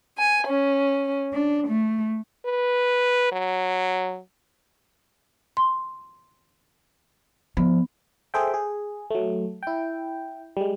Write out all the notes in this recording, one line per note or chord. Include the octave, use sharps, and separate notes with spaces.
G#5
C#4
D4
A3
B4
F#3
C6
F3 B3
G#4 A4 C5 E5 G5
G#4
F#3 A3
E4 G5
G3 G#3